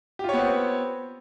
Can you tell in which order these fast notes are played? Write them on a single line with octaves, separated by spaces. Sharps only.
G4 F4 C#5 B3 C4